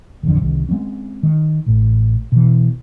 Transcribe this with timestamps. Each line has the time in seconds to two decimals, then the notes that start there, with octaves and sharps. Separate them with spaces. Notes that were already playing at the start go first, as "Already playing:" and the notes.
0.23 D1 A1 F2 D3
0.42 C2 D#3
0.69 G#3 A#3 C4 C#4
1.23 D#3
1.66 A1 A2
2.32 B2 E3